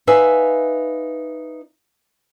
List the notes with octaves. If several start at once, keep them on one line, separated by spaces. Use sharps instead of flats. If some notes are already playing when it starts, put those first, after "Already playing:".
D#4 B4 E5 F5 G#5